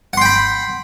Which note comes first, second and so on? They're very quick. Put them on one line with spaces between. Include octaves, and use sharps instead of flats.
F#5 C6 G5 B5